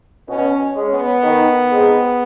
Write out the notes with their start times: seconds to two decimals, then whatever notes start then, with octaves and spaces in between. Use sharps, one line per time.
0.29 B2 C#4
0.76 G#3 C#4
0.91 B3
1.23 D#3
1.71 G#3 C4 D#4